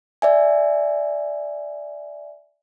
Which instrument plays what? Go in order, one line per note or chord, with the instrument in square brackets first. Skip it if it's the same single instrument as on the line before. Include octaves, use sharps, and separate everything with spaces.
[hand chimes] D5 E5 G#5